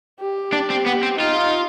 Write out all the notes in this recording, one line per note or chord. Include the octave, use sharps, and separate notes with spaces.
G4
D4
C4
B3
C4
D#4 F4